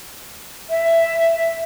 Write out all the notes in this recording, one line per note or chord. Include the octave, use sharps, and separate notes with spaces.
E5